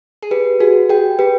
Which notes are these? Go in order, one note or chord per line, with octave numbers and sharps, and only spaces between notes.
G#4
G4 B4
F#4 G#4
G#4 G5
G4 B4